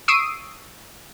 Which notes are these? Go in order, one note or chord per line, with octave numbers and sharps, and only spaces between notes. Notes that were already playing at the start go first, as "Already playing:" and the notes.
C#6 D#6 E6 C7 D7 D#7